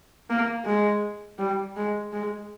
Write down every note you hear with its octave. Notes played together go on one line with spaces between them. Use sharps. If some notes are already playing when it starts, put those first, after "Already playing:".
A#3
G#3
G3
G#3
G#3